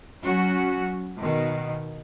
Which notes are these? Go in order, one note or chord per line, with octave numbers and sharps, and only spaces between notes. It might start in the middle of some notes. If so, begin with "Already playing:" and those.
F#3 C#4 F#4
B2 D#3